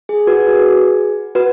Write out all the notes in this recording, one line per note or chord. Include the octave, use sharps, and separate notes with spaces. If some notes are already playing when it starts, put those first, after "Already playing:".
G#4
F#4 B4
G#4
F#4 B4